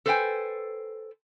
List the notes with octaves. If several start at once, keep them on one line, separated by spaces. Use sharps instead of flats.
A4 B4 C5 E5 G5 G#5